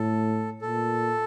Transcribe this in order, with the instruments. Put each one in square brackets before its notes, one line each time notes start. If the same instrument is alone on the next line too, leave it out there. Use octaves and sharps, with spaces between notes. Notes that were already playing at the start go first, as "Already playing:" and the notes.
Already playing: [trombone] A2 [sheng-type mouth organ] A4
[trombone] A#2 [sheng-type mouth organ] A4